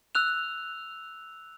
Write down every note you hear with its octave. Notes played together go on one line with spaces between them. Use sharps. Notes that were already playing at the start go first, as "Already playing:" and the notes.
E6 F#6 F7